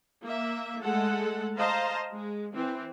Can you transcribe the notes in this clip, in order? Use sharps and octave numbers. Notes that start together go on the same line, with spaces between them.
A#3 E5
G#3 A3 A4 F#5
C5 D#5 F5 A5 A#5
G#3
E3 C4